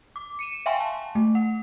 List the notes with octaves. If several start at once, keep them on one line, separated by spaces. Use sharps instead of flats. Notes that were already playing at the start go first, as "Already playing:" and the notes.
D6
C#7 D#7 E7
E5 F5 G5 G#5 C6 C#6
A5
A3
F#5